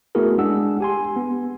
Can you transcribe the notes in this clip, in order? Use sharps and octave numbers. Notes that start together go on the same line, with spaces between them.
A3 B3 E4 F#4 G#4 A#4
G#3 D4 G#4 F#5 E6
G4 G#5 C6
B3